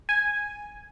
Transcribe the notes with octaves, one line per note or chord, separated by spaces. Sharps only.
G#5